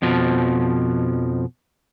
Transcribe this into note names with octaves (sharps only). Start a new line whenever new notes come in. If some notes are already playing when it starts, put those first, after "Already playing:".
F2 B2 F3